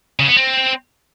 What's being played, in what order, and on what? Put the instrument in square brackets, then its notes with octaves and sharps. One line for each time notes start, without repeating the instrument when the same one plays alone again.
[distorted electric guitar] C#3
B3
C4